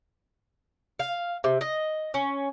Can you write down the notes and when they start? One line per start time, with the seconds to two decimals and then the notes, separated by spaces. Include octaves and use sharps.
0.99 F5
1.44 C3
1.61 D#5
2.14 C#4